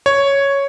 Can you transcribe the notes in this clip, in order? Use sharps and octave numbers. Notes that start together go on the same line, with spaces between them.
C#5